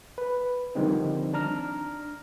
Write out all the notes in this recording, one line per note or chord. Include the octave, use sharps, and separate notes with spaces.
B4
D3 D#3 F3 G3 C4 D#4
D4 A#5 F6